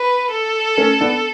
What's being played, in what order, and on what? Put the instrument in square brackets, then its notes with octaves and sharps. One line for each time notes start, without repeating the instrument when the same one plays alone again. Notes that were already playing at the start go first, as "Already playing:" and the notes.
Already playing: [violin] B4
A4
[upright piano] A3 C#4
B3 D4